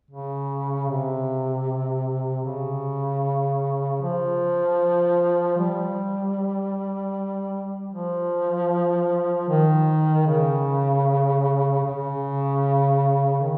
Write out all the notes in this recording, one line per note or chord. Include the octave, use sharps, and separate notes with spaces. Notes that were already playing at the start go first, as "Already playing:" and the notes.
C#3
C3
C#3
F3
G3
F3
D#3
C#3
C#3
D#3